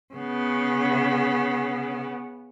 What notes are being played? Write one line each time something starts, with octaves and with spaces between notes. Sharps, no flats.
C#3 B3